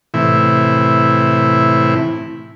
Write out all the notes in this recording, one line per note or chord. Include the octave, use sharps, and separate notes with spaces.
A2 C3 E3 E4